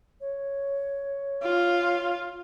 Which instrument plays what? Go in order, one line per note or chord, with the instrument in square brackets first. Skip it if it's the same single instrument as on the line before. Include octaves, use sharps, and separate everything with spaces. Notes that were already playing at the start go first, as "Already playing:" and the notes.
[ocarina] C#5
[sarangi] F4